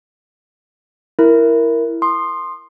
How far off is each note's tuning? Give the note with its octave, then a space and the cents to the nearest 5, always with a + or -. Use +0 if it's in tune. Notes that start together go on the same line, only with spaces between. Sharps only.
E4 +5 A#4 +0
C6 +10 D#6 -25